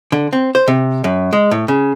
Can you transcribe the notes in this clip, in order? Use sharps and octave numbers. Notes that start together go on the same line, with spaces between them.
D3
C4
C5
C3
F#2
G#3
A2
C#3